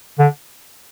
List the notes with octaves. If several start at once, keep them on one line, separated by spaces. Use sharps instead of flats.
D3